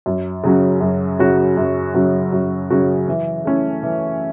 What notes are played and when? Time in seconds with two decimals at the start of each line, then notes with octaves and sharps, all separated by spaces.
0.06 F#2
0.43 C#3 F#3 C#4 F#4
0.81 F#2
1.19 C#3 F#3 C#4 F#4
1.57 F#2
1.94 C#3 F#3 C#4 F#4
2.32 F#2
2.70 C#3 F#3 C#4 F#4
3.08 E3
3.45 A3 C#4 E4
3.83 E3